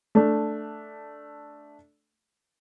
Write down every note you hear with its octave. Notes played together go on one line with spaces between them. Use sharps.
A3 D4